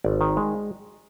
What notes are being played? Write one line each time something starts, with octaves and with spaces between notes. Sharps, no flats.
G#1 D5
D#3
G#3